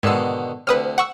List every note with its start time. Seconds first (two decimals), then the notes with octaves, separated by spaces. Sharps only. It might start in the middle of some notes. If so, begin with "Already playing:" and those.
0.03 G#2 B2 D3 D#3 E6
0.67 D2 C3 B4 D#6 F6
0.98 F#5 C#6 E6